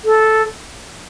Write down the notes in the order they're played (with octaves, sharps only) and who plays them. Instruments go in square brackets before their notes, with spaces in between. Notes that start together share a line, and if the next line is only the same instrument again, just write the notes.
[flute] A4